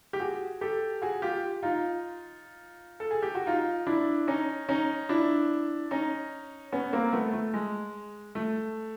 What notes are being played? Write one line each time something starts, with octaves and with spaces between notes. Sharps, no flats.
G4
F#4 G#4
G4 A4
F#4 G#4
F4 G4
D#4 F4
A4
G#4
G4
F#4
D#4 F4
D4 E4
C#4 D#4
C#4 D#4
D4 E4
C#4 D#4
B3 C#4
A#3 C4
A3 B3
A3
G#3
A3